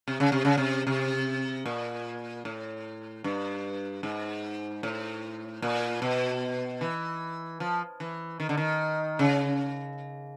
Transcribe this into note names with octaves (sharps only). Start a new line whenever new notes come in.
C3
C#3
C3
C#3
C3
C3
A#2
A2
G2
G#2
A2
A#2
B2
E3
F3
E3
D#3
D3
D#3
C#3